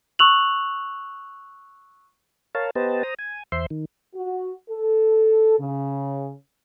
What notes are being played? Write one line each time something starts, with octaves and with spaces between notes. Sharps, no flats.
C#6 E6 F#6 F7 F#7
A#4 C#5 F5 A5
B3 G4 B4 C5 D#5 A5
C5 A#5 D#6
G#5
E2 C5 E5 C6
D#3
F#4
A4
C#3